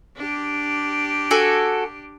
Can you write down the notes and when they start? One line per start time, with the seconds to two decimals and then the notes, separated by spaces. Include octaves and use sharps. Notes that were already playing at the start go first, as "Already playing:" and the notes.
0.17 D4 G4
1.31 F#4 A4 G#5